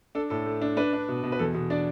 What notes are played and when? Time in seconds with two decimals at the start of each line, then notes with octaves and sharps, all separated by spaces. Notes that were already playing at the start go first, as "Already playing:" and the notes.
0.15 D4 A4
0.30 A2 A4
0.46 A3
0.62 D4
0.77 D4 B4
0.93 D4
1.08 B2
1.23 B2
1.32 B4
1.39 E2 A4
1.54 B2
1.70 D4 D5